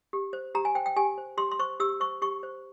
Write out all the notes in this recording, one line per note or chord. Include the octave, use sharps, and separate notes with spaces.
G4
C5
G4 A#5
G#5
C5 G5
G5
G4 G#5
C5
G4 C6
C6
C5 C#6
G4 E6
C5 C#6
G4 C#6
C5